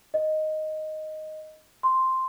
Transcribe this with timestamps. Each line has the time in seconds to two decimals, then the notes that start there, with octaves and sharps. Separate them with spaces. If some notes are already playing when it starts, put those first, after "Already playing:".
0.14 D#5
1.83 C6